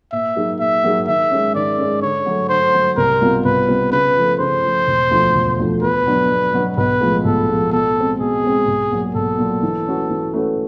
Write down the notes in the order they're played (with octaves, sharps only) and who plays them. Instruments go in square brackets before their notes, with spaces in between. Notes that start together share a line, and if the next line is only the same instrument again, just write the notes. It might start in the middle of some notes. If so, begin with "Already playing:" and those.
[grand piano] A#2 [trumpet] E5
[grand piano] F#3 A#3 D#4 G#4
[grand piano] A#2 [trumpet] E5
[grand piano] F#3 A#3 D#4 G#4
[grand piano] D#3 [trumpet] E5
[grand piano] G#3 C#4
[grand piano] D#3 [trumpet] D5
[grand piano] G#3 C#4
[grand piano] D3 [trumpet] C#5
[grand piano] F#3 A3
[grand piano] D3 [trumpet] C5
[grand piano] F#3 A3
[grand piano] C2 [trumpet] A#4
[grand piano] B2 G3 C4 F4
[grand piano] C2 [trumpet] B4
[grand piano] B2 G3 C4 F4
[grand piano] C#3 [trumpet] B4
[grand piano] F3 A3
[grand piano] C#3 [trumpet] C5
[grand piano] F3 A3
E1
D2 D3 F3 A3
E1
D2 D3 F3 A3
[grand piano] E2 [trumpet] B4
[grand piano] B2 F#3 B3 D4
E2
B2 F#3 B3 D4
[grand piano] B1 [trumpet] B4
[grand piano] A2 F3 G#3
[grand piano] B1 [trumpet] A4
[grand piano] A2 F3 G#3
[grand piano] B2 [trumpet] A4
[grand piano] G#3 C4
[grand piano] B2 [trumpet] G#4
[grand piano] G#3 C4
B1
A#2 F#3
[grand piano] B1 [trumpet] A4
[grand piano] A#2 F#3
E3
A3 C#4 F#4 B4
E3
A3 C#4 F#4 B4